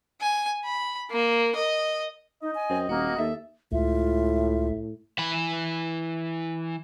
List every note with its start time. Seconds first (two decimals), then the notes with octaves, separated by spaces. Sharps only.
0.21 G#5
0.65 B5
1.10 A#3
1.55 D#5
2.42 D#4 D#5
2.55 G#5
2.69 F#2 C4
2.89 D#1 A#3 F#4
3.18 D#2 A4 E5
3.72 C#2 A2 F4 E5
5.19 E3 B5